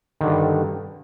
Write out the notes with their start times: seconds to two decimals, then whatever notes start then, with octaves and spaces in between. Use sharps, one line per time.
0.21 D#3
0.23 D3
0.26 G2